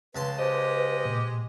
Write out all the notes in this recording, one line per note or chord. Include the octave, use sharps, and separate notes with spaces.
C#2 B4 A5 C6
G#3 G4 C5 D#5
A#2